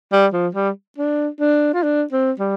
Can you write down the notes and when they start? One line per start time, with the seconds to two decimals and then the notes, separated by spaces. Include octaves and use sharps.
0.12 G3
0.33 F3
0.55 G3
0.98 D4
1.40 D4
1.74 F4
1.83 D4
2.12 C4
2.39 G3